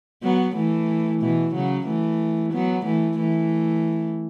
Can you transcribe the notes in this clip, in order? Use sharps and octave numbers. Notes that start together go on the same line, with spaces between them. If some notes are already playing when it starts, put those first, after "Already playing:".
F#3 B3
E3 A3
B2 E3
C#3 F#3
E3 A3
F#3 B3
E3 A3
E3 A3